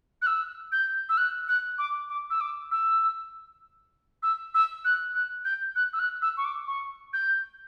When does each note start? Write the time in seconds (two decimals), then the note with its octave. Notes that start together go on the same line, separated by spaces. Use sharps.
0.22 F#6
0.26 E6
0.72 G6
1.09 E6
1.17 F#6
1.48 F#6
1.78 D6
2.09 D6
2.30 E6
2.41 D6
2.71 E6
4.23 E6
4.54 E6
4.85 F#6
5.15 F#6
5.45 G6
5.76 F#6
5.93 E6
5.99 F#6
6.22 E6
6.37 C#6
6.45 D6
6.67 C#6
7.13 G6